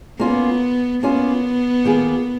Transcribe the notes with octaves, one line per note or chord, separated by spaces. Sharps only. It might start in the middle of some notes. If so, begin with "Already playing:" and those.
A#3 B3 C#4 F4
A#3 B3 C#4 F4
D#3 A#3 F4 G#4